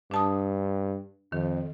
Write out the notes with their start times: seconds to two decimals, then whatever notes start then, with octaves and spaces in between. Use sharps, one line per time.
0.11 G2 D4 A5 D#6
1.32 F2 D#3